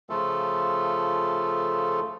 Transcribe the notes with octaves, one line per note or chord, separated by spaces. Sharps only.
C#3 F3 A3 F4 A4